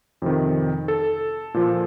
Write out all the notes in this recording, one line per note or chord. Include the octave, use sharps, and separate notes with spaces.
F2 C3 D#3
A4
A#2 F3